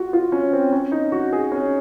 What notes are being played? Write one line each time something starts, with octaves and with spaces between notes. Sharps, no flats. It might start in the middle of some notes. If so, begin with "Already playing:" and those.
Already playing: F4 F#4
F4
C#4
C4
C#4
D#4
F#4
G#4
C#4